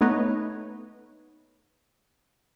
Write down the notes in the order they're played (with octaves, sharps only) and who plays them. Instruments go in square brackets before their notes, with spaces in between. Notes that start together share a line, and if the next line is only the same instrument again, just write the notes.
[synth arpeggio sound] A3 B3 D#4 B4 C#5 D#5